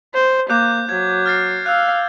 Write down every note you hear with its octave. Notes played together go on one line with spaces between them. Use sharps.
C5
A#3 D6 F#6 G6
F#3 G#6
F6 A6 C7
F5 E6 F#6